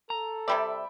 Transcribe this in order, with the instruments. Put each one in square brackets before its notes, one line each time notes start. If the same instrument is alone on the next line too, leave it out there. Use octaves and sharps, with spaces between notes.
[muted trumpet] A4 [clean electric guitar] A#5
[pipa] C3 G3 D5 [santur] E5 G5 B5